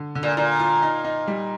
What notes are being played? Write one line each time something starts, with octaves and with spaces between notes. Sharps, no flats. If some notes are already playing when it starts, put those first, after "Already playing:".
Already playing: D3
D3
A#2
A#2 F4
F4
D#4
D#4
G3